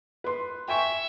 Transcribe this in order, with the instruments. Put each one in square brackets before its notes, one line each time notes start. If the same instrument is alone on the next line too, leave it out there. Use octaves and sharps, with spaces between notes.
[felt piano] B4 C6
[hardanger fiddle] E5 [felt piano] G5 G#5 C#6